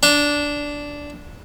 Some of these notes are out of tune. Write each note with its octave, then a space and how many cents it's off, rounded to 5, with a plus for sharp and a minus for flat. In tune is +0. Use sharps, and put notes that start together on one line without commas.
D4 -10 A#5 -40